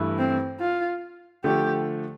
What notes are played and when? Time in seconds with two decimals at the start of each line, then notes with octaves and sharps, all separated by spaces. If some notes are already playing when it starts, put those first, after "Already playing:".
Already playing: G2 E3 A3 E4
0.18 C4
0.60 F4
1.44 D3 F3 A3 G4